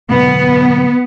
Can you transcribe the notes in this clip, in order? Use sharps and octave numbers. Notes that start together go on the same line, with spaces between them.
B2 D3 F#3 B3